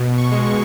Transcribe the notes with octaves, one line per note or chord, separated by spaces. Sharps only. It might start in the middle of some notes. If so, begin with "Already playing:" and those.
Already playing: B2
C#6
G#3
C#6